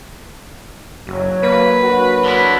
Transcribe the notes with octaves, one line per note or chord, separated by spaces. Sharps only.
F#1 F#3
A#3 B4
F#3 D4 F#4
D3 B3 E4